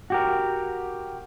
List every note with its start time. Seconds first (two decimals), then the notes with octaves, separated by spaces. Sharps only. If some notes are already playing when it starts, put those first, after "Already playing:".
0.10 F#4 G4 A#4